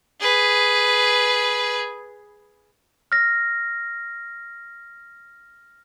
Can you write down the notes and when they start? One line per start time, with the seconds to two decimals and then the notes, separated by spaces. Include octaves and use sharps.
0.21 G#4 B4
3.12 F6 A#6